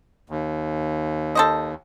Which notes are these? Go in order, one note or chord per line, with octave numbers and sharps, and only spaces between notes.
D#2
A4 C5 D#5